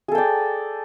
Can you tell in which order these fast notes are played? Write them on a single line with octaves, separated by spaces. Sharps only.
G#4 A4 G5 D5